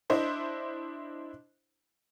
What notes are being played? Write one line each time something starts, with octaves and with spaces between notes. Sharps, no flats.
D4 E4 C5 D#5